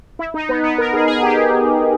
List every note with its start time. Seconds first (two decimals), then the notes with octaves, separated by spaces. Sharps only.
0.19 E4
0.34 D#4
0.49 B3
0.64 B3
0.78 A#4
0.93 G#4
1.08 G#4
1.23 G4